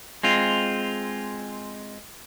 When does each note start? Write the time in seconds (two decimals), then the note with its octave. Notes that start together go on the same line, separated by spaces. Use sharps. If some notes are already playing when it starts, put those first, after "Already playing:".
0.23 G#3 C4 F4